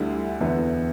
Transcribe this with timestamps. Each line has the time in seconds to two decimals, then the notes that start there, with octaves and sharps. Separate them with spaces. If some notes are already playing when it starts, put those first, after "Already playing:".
Already playing: D2 D3 G3 E4
0.40 E2 D3 B3 E4